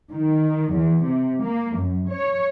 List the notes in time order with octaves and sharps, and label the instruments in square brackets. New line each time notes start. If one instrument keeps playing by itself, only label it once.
[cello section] D#3
E2
C3
A#3
F#2
C#5